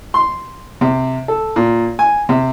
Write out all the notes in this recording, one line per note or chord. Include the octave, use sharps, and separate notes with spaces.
C6
C3
A4
A#2
G#5
C3